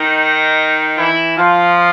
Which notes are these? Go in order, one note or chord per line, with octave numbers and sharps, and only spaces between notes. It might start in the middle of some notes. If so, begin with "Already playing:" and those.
Already playing: D#3 D#4
E3 E4
F3 F4